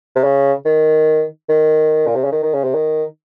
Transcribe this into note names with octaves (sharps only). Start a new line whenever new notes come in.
C3
C#3
D#3
D#3
A#2
C3
C#3
D#3
D#3
C#3
C3
D#3